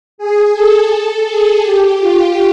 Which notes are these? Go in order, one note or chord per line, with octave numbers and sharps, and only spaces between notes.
G#4
A4
A4
G#4
G4
F4